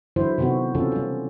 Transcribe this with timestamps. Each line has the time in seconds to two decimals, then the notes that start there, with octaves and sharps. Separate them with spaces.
0.16 D3 E3 F#3 E4 C5
0.38 C3 D#3 B3 C4 F#4
0.75 C#3 E3 C4 C#4 F4 A4
0.92 G3 C#4